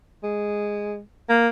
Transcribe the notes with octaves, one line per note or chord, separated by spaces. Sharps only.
G#3
A#3